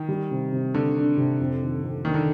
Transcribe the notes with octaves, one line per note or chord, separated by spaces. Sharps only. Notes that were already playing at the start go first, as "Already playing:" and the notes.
Already playing: D#3
G3
C3
C3
D3 D4
D4
C3
F2
D#3
F2
D#3 D4
D3